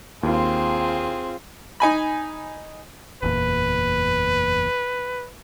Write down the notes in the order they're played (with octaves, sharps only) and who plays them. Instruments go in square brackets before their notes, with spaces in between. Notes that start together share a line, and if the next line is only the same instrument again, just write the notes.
[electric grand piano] D#2 [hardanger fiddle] C4 G#4 [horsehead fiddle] F4
[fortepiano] D#4 G#5 B5
[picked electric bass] F#1 E2 A#2 [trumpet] B4